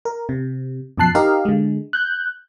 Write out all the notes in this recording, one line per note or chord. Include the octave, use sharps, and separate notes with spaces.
A#4
C3
F#2 B2 F3 A5 F#6 C7
D#4 G4 A#4 D#5 F5
D3 G#3
F#6 G6